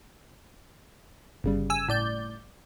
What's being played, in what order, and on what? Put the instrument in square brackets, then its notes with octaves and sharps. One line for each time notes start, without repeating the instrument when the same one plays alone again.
[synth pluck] G1 C#3 G3
[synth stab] G#5 E6
A2 D5 G6